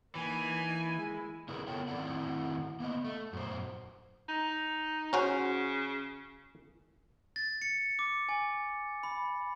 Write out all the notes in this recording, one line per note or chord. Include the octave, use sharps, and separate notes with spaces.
E3 A#3 D#4 G#5
G#3 E4
C#3 E4 G#4 A#4 B4
B3 F4 A4 A#4 C#5 G5
A2 D#3 C4 E4 D5 F#5
A#3 B3 D#5
A3
F#2 A#2 C5
D#4
C#3 C#4 F#4 C5
A6
C#7
D6
G#5
B5